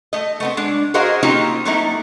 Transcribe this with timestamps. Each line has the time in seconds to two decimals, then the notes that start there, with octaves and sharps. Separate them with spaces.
0.13 A3 D#5
0.40 A3 B3 C4
0.57 G#3 D4
0.94 F#4 G#4 A#4 C5 D#5 F5
1.23 A#3 C4 C#4 D#4 F4 G4
1.65 F#3 A3 A#3 C4 D#4 E4